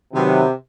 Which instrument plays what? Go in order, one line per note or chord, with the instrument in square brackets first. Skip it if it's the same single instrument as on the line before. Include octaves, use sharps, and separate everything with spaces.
[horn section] C3 [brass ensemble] D#3 F#3 B3